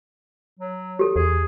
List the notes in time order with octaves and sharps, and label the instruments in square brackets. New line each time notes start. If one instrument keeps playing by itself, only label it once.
[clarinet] F#3
[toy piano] G4 A4
[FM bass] E2 [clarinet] G#4